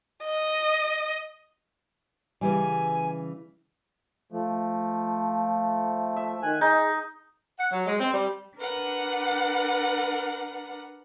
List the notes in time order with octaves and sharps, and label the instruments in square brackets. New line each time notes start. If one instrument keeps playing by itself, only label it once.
[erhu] D#5
[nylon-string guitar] C#3 E3 G3 [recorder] G#5
[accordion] F3 A3
[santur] E5
[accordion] D#3 G#5 F#6
[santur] D#4 [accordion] G#4
[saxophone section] F#5
F#3
G#3
C4
G3
[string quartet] D4 A#4 B4 F#5